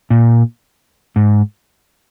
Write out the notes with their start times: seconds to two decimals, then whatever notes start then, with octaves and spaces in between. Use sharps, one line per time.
0.10 A#2
1.16 G#2